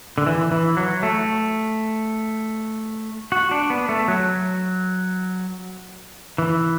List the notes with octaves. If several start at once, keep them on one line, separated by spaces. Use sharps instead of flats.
D3
E3
E3
F#3
A3
F#4
D4
B3
A3
F#3
E3